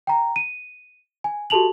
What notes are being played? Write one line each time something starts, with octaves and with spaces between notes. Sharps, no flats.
G5 A#5
D#7
G#5
F#4 G4 A4 A5 F7 F#7